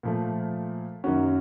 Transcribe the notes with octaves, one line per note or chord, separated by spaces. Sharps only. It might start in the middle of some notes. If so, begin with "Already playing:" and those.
A#2 F3 A3
F#2 D#3 A#3 C#4 F#4